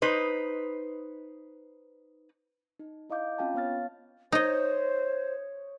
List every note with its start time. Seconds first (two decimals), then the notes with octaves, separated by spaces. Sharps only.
0.02 D#4 B4 C5
2.79 D#4
3.10 E4 D#5 F5 D6 G6
3.38 C4 C#4 F4 F5 G5 A5
3.54 B3 C#5 F5 F6 A6
4.32 D#4 C5 C#5 D#5 D#6